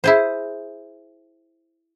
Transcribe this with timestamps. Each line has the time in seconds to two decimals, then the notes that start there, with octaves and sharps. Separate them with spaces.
0.04 E4 G#4 C5